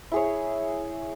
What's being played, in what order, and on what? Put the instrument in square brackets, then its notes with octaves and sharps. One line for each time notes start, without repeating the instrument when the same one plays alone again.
[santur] E4 G#4 C#5